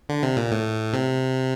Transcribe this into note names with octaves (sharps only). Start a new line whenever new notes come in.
D3
C3
A#2
A2
C3